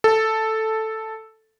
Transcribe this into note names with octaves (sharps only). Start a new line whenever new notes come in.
A4